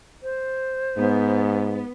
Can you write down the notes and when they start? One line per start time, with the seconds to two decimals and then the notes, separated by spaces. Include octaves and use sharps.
0.23 C5
0.97 G#2 B3